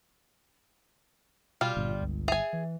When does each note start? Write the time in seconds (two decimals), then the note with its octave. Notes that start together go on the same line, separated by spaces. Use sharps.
1.61 B2 G3 F4
1.77 G1 A#2
2.01 C#2
2.28 G#4 E5 G#5
2.53 E3